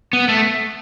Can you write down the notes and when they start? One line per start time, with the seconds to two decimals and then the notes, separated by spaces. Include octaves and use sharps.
0.13 B3
0.28 A3